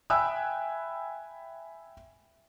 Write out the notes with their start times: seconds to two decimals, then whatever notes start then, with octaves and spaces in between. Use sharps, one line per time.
0.10 E5 G5 G#5 B5 E6 F#6